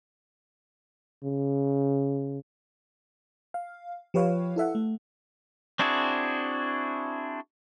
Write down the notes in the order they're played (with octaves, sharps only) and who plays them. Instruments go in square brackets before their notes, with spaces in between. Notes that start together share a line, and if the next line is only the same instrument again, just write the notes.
[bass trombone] C#3
[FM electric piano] F5
F3 G4 B4 C#5 F5
E4 A4 E5 F#5
A3
[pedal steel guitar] C4 D4 E4 F#4 G#4